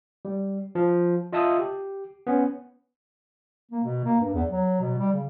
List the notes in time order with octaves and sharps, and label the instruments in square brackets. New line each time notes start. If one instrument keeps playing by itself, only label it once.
[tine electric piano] G3
F3
F4 D#5 E5 A5 D#6 E6
G4
B3 C#4
[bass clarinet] A#3
B2
A#3
G2
E2
F#3
B2
G3
C#3